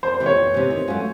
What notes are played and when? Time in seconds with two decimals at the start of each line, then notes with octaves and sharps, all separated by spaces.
0.03 F2 C5
0.14 C5
0.20 C3 E3
0.26 C#5
0.37 F2
0.54 C3 E3
0.70 D#3
0.88 F#3 A3 C#4 F4